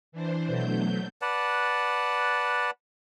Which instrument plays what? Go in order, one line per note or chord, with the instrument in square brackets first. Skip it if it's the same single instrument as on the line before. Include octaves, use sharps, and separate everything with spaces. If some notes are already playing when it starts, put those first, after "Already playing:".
[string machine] E3 D4 C5
B2 F#3 A3 G6
[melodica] B4 D5 F#5 A5